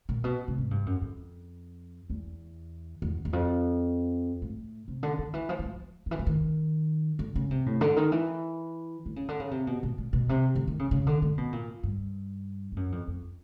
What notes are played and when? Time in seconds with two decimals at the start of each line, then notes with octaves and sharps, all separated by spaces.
0.09 A#2
0.24 B2
0.48 C3
0.58 G#2
0.71 G2
0.86 F#2
1.01 F2
2.10 E2
3.02 E2
3.25 E2
3.33 F2
4.42 A2
4.88 C3
5.03 D3
5.19 D#3
5.34 E3
5.49 F3
5.59 F#3
5.65 F3
6.06 D#3
6.11 E3
6.19 D3
6.27 D#3
7.19 D3
7.36 C#3
7.51 C3
7.66 A2
7.81 D3
7.96 D#3
8.12 E3
9.06 D3
9.16 C#3
9.29 D3
9.40 C#3
9.51 C3
9.67 B2
9.83 B2
9.98 A#2
10.13 B2
10.29 C3
10.56 D3
10.67 D#3
10.79 C#3
10.91 C#3
11.07 D3
11.22 D3
11.38 B2
11.52 A#2
11.83 G2
12.72 G2
12.76 F#2
12.92 F2
13.07 F2